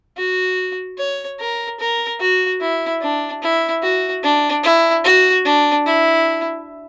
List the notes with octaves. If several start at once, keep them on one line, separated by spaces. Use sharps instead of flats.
F#4
C#5
A#4
A#4
F#4
E4
D4
E4
F#4
D4
E4
F#4
D4
E4